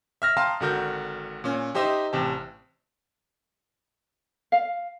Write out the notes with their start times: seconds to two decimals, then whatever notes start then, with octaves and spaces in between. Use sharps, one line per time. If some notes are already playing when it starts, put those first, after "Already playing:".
0.22 E5 F6 A#6
0.37 F5 G5 A5 A#5 C6 D#6
0.60 G#1 D3 F#4 A#4 G6
1.44 A#2 C#4
1.75 D#4 G4 C5 D#5 E5
2.13 A1 C3 G5 A5
4.52 F5